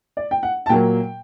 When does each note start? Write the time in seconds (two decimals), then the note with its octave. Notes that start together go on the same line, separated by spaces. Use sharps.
0.17 D5
0.31 G5
0.43 F#5
0.66 A5
0.69 A#2 F#3 A#3 G5